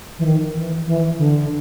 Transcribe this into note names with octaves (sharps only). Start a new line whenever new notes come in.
E3
D#3
E3
E3
D3